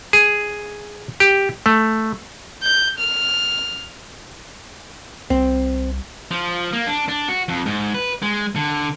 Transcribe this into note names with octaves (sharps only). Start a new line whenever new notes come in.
G#4
G4
A3
G6
F6
C2 C4
F3
A#3
D4
D4
F#4
F2
G#2
B4
G#3
D3